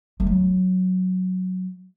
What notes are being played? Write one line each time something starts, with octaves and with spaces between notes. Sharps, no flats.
A3
F#3